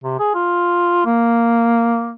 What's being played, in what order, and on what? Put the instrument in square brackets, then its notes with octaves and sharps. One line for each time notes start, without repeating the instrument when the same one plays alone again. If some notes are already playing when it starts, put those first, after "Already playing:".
[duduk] C3
G#4
F4
A#3